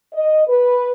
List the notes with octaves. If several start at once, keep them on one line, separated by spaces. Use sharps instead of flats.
D#5
B4